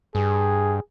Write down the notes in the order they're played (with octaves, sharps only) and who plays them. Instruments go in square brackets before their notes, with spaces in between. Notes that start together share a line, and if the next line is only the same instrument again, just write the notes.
[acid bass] G2 [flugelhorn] G#4